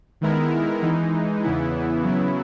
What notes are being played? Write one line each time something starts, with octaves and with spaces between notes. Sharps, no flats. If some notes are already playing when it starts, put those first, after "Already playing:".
D#3 G#3 B3 E4 A#4
E3 G#3 D#4
E2 C#3 E3 B3 E4
C#3 F#3 B3 E4